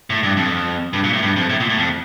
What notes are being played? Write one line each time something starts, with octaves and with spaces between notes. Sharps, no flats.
A2
G2
F2
G2
A#2
A2
G2
F2
A2
A#2
A2
F2